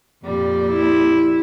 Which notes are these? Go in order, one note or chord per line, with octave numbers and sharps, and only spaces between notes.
F2 A#2 G3
E4